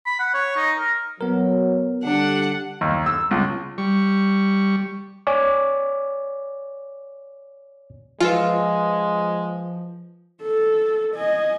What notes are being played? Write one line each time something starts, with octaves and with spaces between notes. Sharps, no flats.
B5
F#5
C#5
D#4
A#4
F#3 B3 A#4
D3 G3 D4 F#5
D#2
E6
C#2
G3 C#6
C#5 D5 G#5 D6
F3 G#3 F4 B4 F5 G#5
A4
D#5 G#5